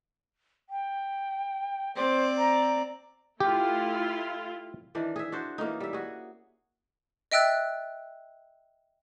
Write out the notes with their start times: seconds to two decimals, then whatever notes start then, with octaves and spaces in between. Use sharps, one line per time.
0.70 G5
1.96 C4 C5 D5
2.38 A#5
3.40 A3 E4 F4 G4
4.95 D#3 E3 D4
5.16 G#4 E5
5.32 D4 F#4 C5
5.58 E3 A#3 C#4 D#4
5.80 G3 E5
5.93 F#4 G#4
7.32 D#5 E5 G5 E6 F#6 A6